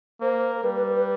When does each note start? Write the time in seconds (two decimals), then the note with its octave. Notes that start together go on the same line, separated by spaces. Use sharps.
0.21 A#3 C5
0.56 A#4
0.63 G3 B4
0.74 B4
0.95 B4